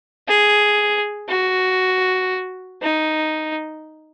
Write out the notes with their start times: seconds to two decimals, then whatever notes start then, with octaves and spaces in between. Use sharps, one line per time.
0.28 G#4
1.29 F#4
2.82 D#4